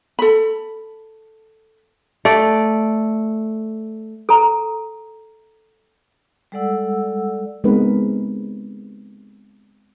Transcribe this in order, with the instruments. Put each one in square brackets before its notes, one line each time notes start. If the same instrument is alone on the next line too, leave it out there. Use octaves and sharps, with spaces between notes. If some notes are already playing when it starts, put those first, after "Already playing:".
[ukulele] A4 B5
[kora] A3 D5
[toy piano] A4 A#5
[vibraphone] G3 G#3 A4 D5 F#5 E6
[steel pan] G#3 B3 C4 D#4 A#4 B4